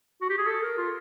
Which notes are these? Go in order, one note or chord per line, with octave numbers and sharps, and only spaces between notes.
F#4
G4
G#4
A4
A#4
F4